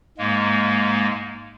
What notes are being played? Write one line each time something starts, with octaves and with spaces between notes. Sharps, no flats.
G#2 G#3 A#3